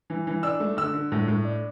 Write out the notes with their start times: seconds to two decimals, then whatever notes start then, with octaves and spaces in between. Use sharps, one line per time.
0.10 E3
0.27 E3
0.43 D4 E6
0.60 A3
0.77 D3 E6
0.94 D3
1.12 A2
1.28 A2
1.45 D4